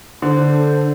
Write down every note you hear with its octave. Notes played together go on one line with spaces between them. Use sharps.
D3 D4 A4 C5